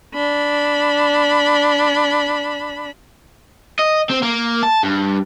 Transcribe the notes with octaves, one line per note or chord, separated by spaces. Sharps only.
D4 B5
D#5
C4
A#3
A5
G2